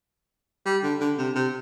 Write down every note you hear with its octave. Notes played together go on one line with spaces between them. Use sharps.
G3
D3
D3
C3
C3